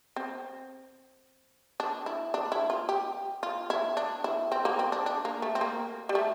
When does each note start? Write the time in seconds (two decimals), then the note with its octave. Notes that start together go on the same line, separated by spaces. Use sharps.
0.16 C4
1.80 D4
2.06 E4
2.34 D4
2.52 E4
2.70 F4
2.89 G4
3.43 F4
3.70 E4
3.97 D4
4.24 E4
4.52 C4
4.65 A#3
4.79 C4
4.92 D4
5.06 D4
5.25 A#3
5.42 A3
5.55 C4
5.61 A#3
6.09 G3
6.15 A3